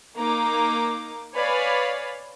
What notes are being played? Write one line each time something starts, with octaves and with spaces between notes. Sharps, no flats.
A#3 D#4 A#5 D6
B4 C#5 D5 F5 G#5 B5